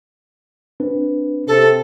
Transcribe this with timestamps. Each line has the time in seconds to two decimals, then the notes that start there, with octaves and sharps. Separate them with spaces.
0.80 C4 D4 B4
1.48 C3 A4